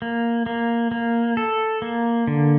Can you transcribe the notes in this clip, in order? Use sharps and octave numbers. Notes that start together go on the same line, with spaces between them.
A#3
A#3
A#3
A4
A#3
D3